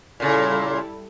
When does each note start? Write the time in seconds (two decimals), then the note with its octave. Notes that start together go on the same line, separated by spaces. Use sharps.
0.20 A#2 C#3 G3 E4 A4